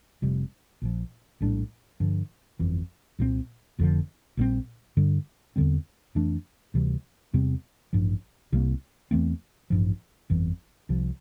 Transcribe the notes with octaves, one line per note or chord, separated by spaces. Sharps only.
F1 F2 C3 G3
A#1 A#2 F3
A#1 A2 G3 D4
G2 D3 F3
G1 F2 E3
C2 A#2 F3 C4
F1 F2 D3 F3
A#1 A#2 G3 C4
G2 D3 G3
E2 D3 G3 C4
F2 E3 A3 D4
D2 C3 E3 G3
E2 C3 G3 C4
A1 G2 F3
C2 C3 G3 A#3
E2 E3 A3 C4
A1 G2 F3
G1 F2 E3
C2 C3 F3